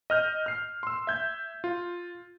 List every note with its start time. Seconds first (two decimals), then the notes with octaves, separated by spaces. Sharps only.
0.10 D#5 F6 G6
0.46 F6 C7
0.83 C6 E6
1.07 E5 G6 G#6
1.64 F4